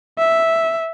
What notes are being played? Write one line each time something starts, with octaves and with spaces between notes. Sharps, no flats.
E5